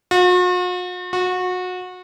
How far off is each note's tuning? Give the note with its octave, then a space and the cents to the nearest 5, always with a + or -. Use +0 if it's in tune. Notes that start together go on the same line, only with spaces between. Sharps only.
F#4 -45
F#4 -25